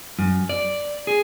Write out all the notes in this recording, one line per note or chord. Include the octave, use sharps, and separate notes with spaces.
F#2
D5
G#4